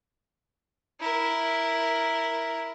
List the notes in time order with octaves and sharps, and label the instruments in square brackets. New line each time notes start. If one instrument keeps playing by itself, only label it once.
[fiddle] E4 A#4